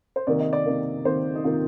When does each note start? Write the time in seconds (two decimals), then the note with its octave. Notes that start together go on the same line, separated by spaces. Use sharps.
0.16 C5
0.27 C3 D#3 A#3 D5
0.40 D#5
0.53 D5
0.65 C3 D#3 A#3
1.05 C3 D#3 A#3 C5
1.35 D#4
1.44 C3 D#3 A#3 F4